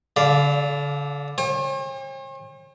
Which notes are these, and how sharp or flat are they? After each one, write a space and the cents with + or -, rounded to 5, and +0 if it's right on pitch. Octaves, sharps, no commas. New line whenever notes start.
D3 -35 D5 +0 F5 +0
C#5 -45 G5 +45